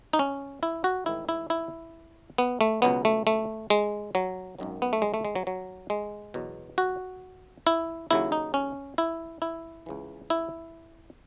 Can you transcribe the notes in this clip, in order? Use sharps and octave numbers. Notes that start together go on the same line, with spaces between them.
D#4
C#4
E4
F#4
A1 G#2 D#3 E4
E4
E4
B3
A3
C#2 B2 F#3 B3
A3
A3
G#3
F#3
G#1 F#2 D#3 F#3
B3
A3
G#3
A3
G#3
F#3
F#3
G#3
E2 B2 F#3
F#4
E4
D#2 C#3 F#3 E4
D#4
C#4
E4
E4
C#2 C#3 E3
E4